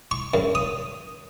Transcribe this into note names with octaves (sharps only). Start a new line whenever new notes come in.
C#6
F#2
D#6